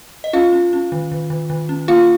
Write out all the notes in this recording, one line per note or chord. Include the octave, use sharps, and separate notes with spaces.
D#5
C#4 F4 F5
C#4
C#4
D#3
D#3
D#3
D#3
C#4
A#3 F4 F5